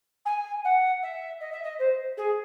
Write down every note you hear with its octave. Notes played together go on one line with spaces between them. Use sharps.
G#5
F#5
E5
D#5
E5
D#5
C5
G#4